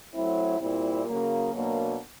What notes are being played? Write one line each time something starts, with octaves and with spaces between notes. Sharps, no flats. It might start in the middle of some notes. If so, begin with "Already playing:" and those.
F#3 A3 C4 E4
A#2 G3 C4 E4
C#3 F#3 A#3
B2 F#3 A#3 D4